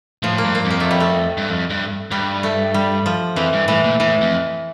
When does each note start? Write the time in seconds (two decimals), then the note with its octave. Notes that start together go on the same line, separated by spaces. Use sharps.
0.23 A2 F3
0.38 A#3
0.45 G2
0.55 A#3
0.65 F2
0.70 A#3
0.80 A3
0.91 G3
1.00 A3
1.37 G2
1.49 F2
1.70 G2
2.11 G2 G3
2.43 A3
2.74 G3
3.06 F3
3.36 F2 E3
3.53 G2
3.68 A2 E3
3.84 A#2
4.00 A2 E3
4.21 F2